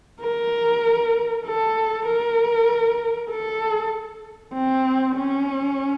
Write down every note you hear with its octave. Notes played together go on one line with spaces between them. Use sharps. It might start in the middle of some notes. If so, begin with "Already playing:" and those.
A#4
A4
A#4
A4
C4
C#4